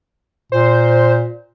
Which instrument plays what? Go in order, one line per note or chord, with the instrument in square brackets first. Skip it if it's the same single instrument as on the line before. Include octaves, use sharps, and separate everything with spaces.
[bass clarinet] A#2 [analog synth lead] C5